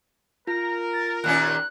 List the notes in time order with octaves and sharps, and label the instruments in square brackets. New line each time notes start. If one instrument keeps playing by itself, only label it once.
[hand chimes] F4 [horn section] A#4 [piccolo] A#6
[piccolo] A6
[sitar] D#2 A#2 C#4 [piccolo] F#6